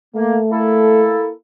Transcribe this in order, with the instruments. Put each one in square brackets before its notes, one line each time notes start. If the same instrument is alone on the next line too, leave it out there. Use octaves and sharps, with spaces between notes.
[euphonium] A3 [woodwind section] A#3
[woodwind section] A#3 E4 A4